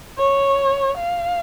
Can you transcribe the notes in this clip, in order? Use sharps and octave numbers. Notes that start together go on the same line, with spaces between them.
C#5
F5